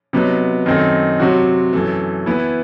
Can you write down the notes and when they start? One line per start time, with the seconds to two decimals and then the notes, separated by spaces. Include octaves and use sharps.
0.13 C3 F#3 B3 D#4
0.66 F#2 D#3 A3 C4 D#4
1.20 C3 F#3 C4 F#4
1.73 F#2 E3 A3
2.26 E3 B3 E4